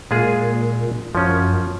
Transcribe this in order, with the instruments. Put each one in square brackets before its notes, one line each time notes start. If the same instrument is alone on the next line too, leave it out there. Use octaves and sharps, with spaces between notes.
[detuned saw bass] A#2 [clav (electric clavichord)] G#3 F4 G#4
[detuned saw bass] F#2 [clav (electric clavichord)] F3 C#4